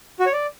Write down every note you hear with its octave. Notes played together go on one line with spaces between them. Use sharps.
F#4
C#5
D5